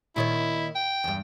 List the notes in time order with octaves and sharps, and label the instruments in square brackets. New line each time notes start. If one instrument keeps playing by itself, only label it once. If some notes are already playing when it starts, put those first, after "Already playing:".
[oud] A#2 D#3 C#5 [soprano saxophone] E4
[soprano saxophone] G5
[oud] E2 G2